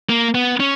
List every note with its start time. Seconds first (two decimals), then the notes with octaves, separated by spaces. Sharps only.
0.09 A#3
0.35 B3
0.60 C#4